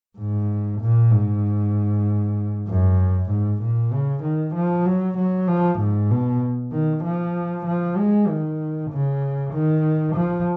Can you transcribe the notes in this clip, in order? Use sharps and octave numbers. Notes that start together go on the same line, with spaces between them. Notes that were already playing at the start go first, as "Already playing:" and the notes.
G#2
A#2
G#2
F#2
G#2
A#2
C#3
D#3
F3
F#3
F#3
F3
G#2
B2
D#3
F3
F3
G#3
D#3
C#3
D#3
F3